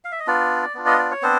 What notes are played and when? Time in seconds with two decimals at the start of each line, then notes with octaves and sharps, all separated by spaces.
0.05 F5
0.12 E5
0.20 D#5
0.27 B3 D4 F4 D5
0.75 B3 D4 F4
0.86 D#5
0.98 D5
1.11 C#5
1.22 B3 C4 D4 C5